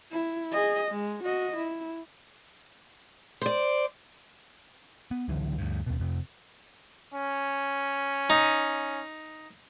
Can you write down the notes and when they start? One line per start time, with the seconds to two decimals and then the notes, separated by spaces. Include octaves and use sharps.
0.12 E4
0.51 G#4 D#5
0.91 G#3
1.23 F#4 D#5
1.56 E4
3.42 C5 D5
5.11 B3
5.28 C#2 D3 E3 F#3
5.58 D2 G2
5.86 D#2 B2
5.99 F2 C3
7.14 C#4
8.30 D#4